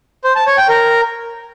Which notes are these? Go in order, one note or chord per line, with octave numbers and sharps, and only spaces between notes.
C5
A5
C#5
G5
A#4